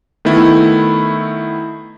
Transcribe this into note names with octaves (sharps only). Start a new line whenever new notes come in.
D#3 A3 B3 E4